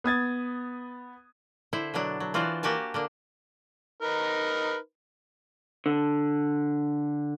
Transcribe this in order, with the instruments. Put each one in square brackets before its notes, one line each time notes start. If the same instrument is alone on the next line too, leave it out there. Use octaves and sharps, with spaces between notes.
[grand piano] B3 D#6 G#6 A6
[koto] D3 E4 C5
B2 D3 F#3 D4
F#3
E3 F4 F#4 C5 D5
A#3 F#4 G4 G#5 A5
D3 A#3 D4
[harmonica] D#4 A#4 B4
[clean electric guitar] D3